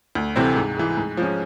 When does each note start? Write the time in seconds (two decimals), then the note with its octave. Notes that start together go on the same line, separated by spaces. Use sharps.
0.15 D2
0.36 C3 E3 A3 C4
0.56 G#2
0.77 E3 G#3
0.97 G#2
1.17 F3 G#3 C#4